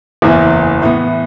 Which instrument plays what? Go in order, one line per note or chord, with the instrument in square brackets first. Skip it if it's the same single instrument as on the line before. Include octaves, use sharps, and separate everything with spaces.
[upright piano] F#1 E2 E3
A2 E3 B3